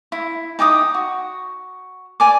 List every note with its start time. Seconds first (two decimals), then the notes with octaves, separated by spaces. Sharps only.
0.12 E4
0.59 D#4 G5 D6 D#6
0.94 F#4
2.20 D5 G#5 D6